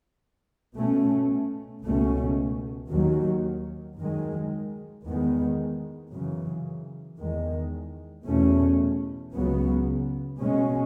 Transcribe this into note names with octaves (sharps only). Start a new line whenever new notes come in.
B2 A3 C#4
C#2 B2 A3 C#4
D#2 D#3 F#3
F#2 D#3 G#3
E2 D#3 G#3 B3
F#2 C#3 E3
E2 D#3 G#3
E2 B2 A3 C#4
C#2 C#3 F#3 B3
B2 G#3 C#4